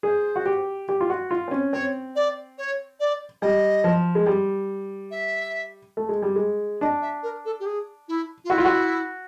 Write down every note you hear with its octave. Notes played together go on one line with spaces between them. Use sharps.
G#4 C5
F#4
G4
G4
F4
F#4
F4
C4
C#4
C4 C#5
D5
C#5
D5
G3 D#5
F3
G#3
G3
E5
A3
G#3
G3
G#3
D4 D#5
E5
A#4
A4
G4
G#4
E4
F4
E4 F#4
F4
F#4